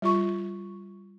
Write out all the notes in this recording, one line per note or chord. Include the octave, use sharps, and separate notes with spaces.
G3 F4 C#6